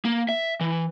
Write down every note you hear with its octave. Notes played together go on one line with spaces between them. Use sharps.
A#3
E5
E3